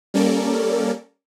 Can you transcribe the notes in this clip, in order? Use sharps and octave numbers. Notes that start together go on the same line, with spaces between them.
G3 A#3 C#4 A4 A#4 D5